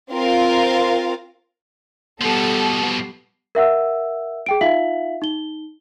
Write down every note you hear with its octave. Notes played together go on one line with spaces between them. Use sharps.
C4 F4 A#4 F5
B2 F3 G3 B3 A4
A#4 E5 F#5 E6
G#4 G5 D7
D#4 F4 E5 F5 B6 F#7
D#4 G7